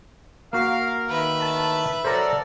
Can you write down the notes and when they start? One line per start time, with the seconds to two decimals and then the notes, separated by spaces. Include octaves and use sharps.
0.53 A#3 F#4 A#4 F5 F6
1.08 D#3 B4 E5
1.40 A2 A5
2.05 F#3 F#4 A4 A#4 C5 D5 A#5